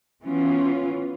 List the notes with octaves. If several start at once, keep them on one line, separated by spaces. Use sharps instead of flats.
E3 B3 C#4 F4